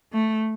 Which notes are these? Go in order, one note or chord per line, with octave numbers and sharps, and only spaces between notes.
A3